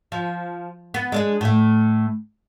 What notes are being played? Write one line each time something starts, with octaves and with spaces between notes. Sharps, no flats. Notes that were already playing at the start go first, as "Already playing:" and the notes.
F3
B3
G#3 D4 G#4
A2 A3